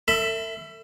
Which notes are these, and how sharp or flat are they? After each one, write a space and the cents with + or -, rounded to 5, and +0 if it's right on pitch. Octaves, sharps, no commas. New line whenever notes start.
A4 +40 E5 +0 B5 +45